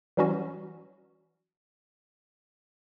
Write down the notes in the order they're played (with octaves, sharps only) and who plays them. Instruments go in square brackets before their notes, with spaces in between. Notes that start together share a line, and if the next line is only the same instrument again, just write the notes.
[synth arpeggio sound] E3 F#3 G3 C#4 F#4